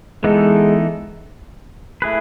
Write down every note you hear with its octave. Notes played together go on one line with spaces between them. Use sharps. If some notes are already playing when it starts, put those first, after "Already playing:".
E3 G#3 B3 D#4 A4
A3 E4 G#4 B4